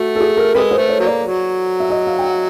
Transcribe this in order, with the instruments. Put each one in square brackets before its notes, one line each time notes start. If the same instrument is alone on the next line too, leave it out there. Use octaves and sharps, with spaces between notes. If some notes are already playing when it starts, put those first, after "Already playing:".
Already playing: [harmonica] A3 [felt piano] F#4
[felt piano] A4
G#4
A#4
[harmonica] C3 G#3 [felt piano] B4
[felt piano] C5
[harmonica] A3
[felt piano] C#5
[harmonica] F#3 A#3
[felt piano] D5
[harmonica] F#3
[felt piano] E5
D#5
F5
G5
F#5